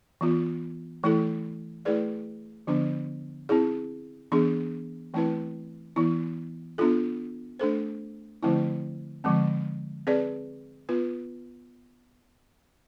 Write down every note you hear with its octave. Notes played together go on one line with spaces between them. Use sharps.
E3 B3 F4
E3 A3 E4 A4
A3 E4 G#4 B4 D5
D3 F3 B3 D4
C4 E4 G#4
E3 B3 D4 G#4
E3 A3 C4 E4 B4
E3 B3 E4
B3 D4 F4 A4
A3 D4 A4 C5
D3 F3 A3 C4 E4
D3 F3 G#3 C4
C4 G#4 B4 D5
B3 F4 B4